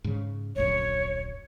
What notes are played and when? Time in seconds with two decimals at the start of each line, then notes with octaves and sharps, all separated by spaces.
0.04 G#2 C#3
0.56 D1 A#1 F#2 C#5